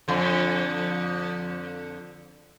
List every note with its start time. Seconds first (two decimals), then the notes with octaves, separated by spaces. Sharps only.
0.08 F2 D3